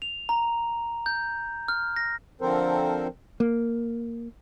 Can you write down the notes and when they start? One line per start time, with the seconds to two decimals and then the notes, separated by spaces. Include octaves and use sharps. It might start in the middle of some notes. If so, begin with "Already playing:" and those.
0.02 F7
0.29 A#5
1.06 G6
1.68 F6
1.96 A#6
2.41 D3 F3 C4 A4 A#4 C5
3.40 A#3